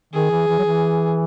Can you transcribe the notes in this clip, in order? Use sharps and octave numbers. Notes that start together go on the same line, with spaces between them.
D#3 G#4
E3
E3
F#3
E3